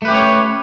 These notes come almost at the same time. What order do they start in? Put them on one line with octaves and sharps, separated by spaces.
A3 B4 G4 C#4 C#5